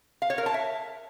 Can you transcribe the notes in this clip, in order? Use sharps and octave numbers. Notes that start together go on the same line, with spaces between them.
F5
C#5
A#4
A5
E5